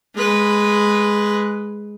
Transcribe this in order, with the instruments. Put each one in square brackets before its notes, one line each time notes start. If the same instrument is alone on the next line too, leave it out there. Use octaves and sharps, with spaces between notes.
[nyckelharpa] G#3 B4